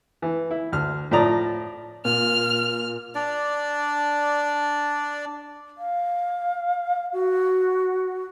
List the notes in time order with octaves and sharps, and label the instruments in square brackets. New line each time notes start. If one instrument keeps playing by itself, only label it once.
[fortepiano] E3
E4
D2 F6
A2 F3 D5 A#5 D#6
[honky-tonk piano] A#2 [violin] F6
[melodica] D4 D5
[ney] F5
F#4